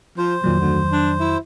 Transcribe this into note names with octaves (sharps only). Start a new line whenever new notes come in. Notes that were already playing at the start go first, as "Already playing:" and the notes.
F3 C5
F2 A#2 D#3 F#3
D2
D4
E4